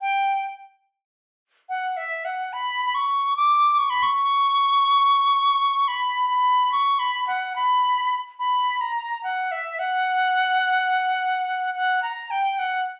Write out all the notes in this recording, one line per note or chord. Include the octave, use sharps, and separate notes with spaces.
G5
F#5
E5
F#5
B5
B5
C#6
D6
C#6
B5
C#6
B5
B5
C#6
B5
F#5
B5
B5
A#5
F#5
E5
F#5
F#5
A#5
G5
F#5